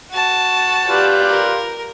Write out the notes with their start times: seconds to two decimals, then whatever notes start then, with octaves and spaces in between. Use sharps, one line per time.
0.11 F#4 A5
0.87 F4 G4 B4 D5
1.28 A#4